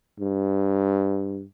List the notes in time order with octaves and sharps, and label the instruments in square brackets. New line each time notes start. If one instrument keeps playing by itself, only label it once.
[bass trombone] G2